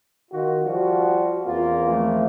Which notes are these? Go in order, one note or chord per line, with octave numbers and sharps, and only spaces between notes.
D#3 F4 F#4
F3 G3 F#4
E2 A#3 C4 F4
E3 F3 A3